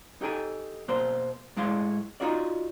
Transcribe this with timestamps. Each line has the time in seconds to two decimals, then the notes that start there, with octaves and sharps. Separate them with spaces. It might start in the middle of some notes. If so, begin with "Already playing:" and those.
0.21 D#4 G4 A4 G5 G#5
0.88 B2 A#3 C5
1.57 A2 G#3 E4 F5 C6
2.20 D#4 F4 F#4 D5